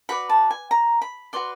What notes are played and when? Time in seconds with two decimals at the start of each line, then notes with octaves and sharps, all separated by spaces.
0.09 F#4 B4 D5 B5
0.29 A5
0.51 G#5
0.71 A#5
1.01 B5
1.33 F#4 B4 D5 C6